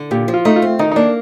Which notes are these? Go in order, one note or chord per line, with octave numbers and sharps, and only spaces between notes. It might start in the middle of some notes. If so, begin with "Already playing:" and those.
Already playing: D3
A#2 G4
F3
F4
A3 D#4
F4
C4
D#3 D#4
D#4
A#3 D4